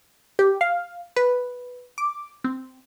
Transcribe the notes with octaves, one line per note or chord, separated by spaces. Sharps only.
G4
F5
B4
D6
C4